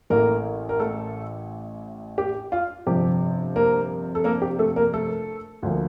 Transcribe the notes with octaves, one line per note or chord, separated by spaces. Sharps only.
A1 A2 A3 A#3 A#4
A#4
A3 A4
G4
F4
G1 F2 C3 F3 G4
A#3 A#4
A4
A#3 A#4
G4
A3 A4
A#3 A#4
A3 A4
D2 D3 F3 A#3